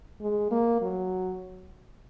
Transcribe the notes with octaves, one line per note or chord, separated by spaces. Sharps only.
G#3
A#3
F#3